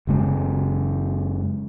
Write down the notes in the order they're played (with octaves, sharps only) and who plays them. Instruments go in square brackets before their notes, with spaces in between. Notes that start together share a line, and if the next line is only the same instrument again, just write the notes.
[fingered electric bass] F#1 C#3 G#3